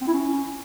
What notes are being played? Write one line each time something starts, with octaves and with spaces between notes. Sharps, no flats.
C4
E4
C#4